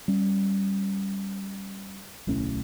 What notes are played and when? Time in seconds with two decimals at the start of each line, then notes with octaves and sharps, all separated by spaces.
0.08 G3 C#4
2.27 D1 B1 A2 C#4